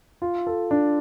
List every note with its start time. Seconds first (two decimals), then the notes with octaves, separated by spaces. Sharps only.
0.22 F4
0.47 A4
0.71 D4